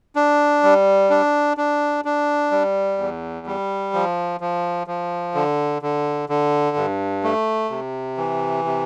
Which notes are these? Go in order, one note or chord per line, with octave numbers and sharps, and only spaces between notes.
D4
G3
D4
D4
D4
G3
E2
G3
F3
F3
F3
D3
D3
D3
G2
A3
C3
E3
C3